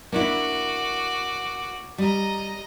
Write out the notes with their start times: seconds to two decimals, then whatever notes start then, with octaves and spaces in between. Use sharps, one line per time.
0.12 A#3 D4 E4 F#4 D6
1.98 G3 D#5 A#5